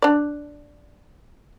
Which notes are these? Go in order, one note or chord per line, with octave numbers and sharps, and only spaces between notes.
D4 D5